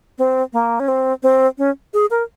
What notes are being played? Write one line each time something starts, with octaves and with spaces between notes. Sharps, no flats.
C4
A#3
C#4
C4
C4
C#4
G#4
A#4